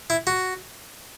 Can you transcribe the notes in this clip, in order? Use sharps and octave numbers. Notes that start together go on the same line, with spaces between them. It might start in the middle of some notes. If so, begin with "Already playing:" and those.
E4
F#4